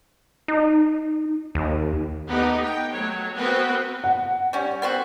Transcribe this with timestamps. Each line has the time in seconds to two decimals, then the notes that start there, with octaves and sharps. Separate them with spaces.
0.48 D#4
1.55 D#2
2.29 A3 B3 D#4 G4
2.63 G5
2.93 F#3 A3 C#5
3.35 B3 C4 F#4 A#4 B4 G5
4.04 F#5
4.53 G3 C#4
4.82 B3 C4 F#4